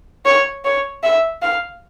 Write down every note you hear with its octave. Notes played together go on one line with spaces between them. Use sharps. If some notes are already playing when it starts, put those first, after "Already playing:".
C#5
C#5
E5
F5